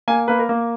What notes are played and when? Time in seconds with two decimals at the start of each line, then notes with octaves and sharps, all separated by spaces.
0.08 A#3 G#5
0.28 A#3 B4
0.39 A#4
0.49 A#3